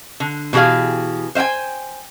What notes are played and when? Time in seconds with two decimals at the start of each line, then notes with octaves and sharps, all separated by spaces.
0.20 D3
0.53 B2 E3 G4 G#4 F5
1.35 C5 E5 F5 G5 G#5